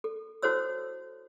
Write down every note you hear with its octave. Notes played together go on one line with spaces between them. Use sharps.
A4
E4 F#4 A4 C5 C#5 E6